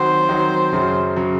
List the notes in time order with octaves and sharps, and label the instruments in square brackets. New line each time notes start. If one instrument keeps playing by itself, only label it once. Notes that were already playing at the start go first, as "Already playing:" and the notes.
Already playing: [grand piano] D#3 F#3 C4 F#4 [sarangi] C5
[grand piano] D#3 F#3 C4 F#4
F#2 C#3 F#3
C#3 F#3